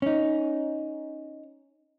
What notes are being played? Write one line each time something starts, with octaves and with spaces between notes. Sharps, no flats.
C#4 D#4